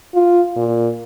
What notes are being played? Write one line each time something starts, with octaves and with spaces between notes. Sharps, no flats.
F4
A#2